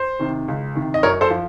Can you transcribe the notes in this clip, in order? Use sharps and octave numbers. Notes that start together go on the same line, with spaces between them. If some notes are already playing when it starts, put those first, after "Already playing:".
Already playing: C5
C3 D#3
C#2
C3 D#3
D#5
F#2 A#4 C#5
A4 C5
F3